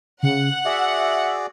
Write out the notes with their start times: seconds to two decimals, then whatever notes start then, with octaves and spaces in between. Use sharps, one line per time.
0.23 C#3 F#5
0.65 F#4 G#4 D5 E5